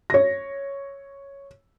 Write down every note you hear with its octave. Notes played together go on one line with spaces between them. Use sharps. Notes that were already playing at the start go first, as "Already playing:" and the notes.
C#5 A#6